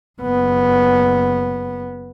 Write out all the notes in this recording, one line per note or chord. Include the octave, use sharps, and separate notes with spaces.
F#1 B3